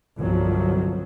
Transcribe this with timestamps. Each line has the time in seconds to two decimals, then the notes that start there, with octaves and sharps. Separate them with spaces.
0.19 G1 C2 F3 F#3